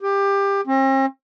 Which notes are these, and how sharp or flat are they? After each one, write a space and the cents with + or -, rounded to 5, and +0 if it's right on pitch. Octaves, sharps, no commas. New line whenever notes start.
G4 +20
C4 +45